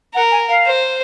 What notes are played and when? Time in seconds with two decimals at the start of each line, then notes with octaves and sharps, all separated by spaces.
0.15 A#4 F#5
0.31 G#5
0.49 F5
0.66 C5